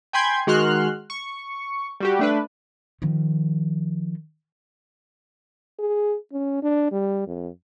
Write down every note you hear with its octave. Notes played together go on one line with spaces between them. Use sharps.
G5 G#5 B5 C6 G6 G#6
D#3 G#3 F#4 C6 F6 F#6
C#6
G3 F#4 G4
A3 D4 B4
D#3 F3
G#4
C#4
D4
G3
F2